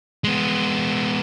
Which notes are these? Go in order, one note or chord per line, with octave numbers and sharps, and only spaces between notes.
G#3 B3